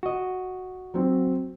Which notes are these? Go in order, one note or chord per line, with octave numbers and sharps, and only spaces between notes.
F#4 D#5
F#3 C4